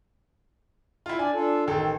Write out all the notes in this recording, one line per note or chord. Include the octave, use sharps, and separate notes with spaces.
E4 F4
D4 D5 G#5
D4 F4 A4
A1 D#3 A4 G5